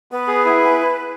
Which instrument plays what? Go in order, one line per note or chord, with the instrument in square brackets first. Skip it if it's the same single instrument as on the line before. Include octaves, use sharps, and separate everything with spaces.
[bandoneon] B3 [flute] B4
[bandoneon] G#4
E4